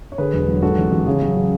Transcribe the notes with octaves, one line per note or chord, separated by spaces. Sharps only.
C#5
D3 G#4 B4
E1
F#3
G#2 F#4 A4
A1
A1
C#3 G#4
F#3
F#3